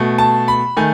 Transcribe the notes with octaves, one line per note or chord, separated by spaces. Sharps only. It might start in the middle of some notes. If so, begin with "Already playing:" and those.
Already playing: B2 A3
A5
B5
D#3 A3 G#5